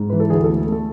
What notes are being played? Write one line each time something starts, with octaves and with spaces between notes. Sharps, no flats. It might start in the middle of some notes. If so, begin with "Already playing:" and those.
Already playing: G#2
E3 B4
A4
D2 G#4
A4
A3
A3 A4